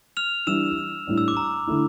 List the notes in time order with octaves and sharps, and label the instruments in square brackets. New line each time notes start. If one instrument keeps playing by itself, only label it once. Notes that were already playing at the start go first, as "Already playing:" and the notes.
[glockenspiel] F6 F7
[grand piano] E3 G3 D4 [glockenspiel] E6 E7
[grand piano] A2 G3 D4
[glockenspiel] E6
D6
A#5
[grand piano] D3 A3 E4